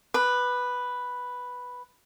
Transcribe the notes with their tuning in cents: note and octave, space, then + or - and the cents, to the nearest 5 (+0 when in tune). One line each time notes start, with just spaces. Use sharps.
B4 +0 D6 +35